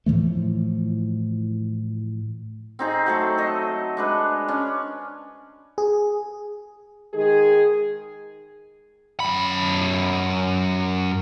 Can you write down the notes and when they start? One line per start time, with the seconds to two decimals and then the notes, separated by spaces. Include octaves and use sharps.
0.06 A2 E3 F3 A3
2.79 C4 D#4 G#4
3.06 F#3 A3 A4
3.38 A4 D#5
3.97 G#3 D4 B4
4.48 C#4 D4
5.78 G#4
7.14 D#3 G#3 G#4
9.20 F#2 B5